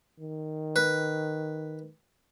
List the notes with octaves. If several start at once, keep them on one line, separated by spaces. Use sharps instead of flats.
D#3
B4